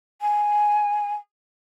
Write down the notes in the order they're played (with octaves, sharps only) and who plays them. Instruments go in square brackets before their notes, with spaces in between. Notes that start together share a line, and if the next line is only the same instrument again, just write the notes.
[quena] G#5